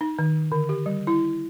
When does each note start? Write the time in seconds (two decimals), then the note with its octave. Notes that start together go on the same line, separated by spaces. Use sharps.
0.01 D#4
0.19 D#3
0.52 D3
0.69 G4
0.86 G3
1.07 E4